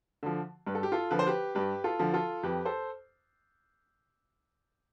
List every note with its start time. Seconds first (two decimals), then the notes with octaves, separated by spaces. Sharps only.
0.23 D3 F3
0.67 G2 B4
0.75 A4
0.83 G4
0.92 F4 A4
1.11 D3 F3 B4
1.19 C5
1.27 G4 B4
1.55 G2 G4 B4
1.84 F4 A4
1.99 D3 F3
2.14 F4 A4
2.43 F2 G4 B4
2.65 A4 C5